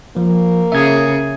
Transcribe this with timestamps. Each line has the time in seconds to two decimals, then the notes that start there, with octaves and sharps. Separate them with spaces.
0.17 F3 A#3
0.72 C#3 G#4 E5 G#6